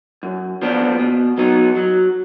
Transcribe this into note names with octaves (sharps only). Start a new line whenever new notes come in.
F#2
F3 B3 D4
B2
F#3 B3 D#4
F#3